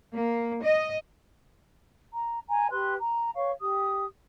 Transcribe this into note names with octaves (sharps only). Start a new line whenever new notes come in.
A#3
D#5
A#5
G#5 A#5
G4 B4 C6 F#6
A#5
B4 C#5 F5 C#6
G4 D#6